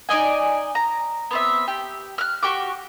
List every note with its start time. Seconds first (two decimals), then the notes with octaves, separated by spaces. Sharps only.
0.09 D#4 D5 D#5 G#5
0.75 A#5
1.31 B3 C4 E5
1.68 G4
2.18 F6 F#6
2.43 F#4 G4 C#6 D6